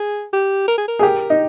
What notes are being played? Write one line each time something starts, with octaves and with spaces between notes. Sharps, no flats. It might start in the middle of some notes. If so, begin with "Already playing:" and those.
Already playing: G#4
G4
A#4
G#4
A#4
G#4
G4 A#4
D#4